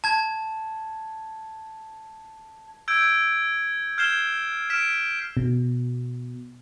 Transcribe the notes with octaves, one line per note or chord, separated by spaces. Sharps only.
A5 G#6
E6 G6 G#6 D7
F6 G6 G#6 C7 E7 G7
F6 B6 D7 E7
B2